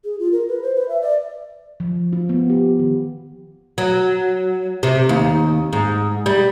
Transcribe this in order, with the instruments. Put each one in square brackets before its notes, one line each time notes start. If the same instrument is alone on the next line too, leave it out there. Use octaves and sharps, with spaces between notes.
[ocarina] G#4
F4
A#4
B4
C5
B4
E5
D5
[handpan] F3
F4
B3
G4
D#3
[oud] F#3
C3
D#2
G#2
G3